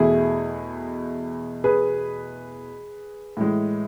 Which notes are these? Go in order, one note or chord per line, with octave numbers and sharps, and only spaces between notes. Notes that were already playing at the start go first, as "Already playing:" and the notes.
Already playing: E2 B2 A3 E4 G#4
G#4 B4
A2 E3 G#3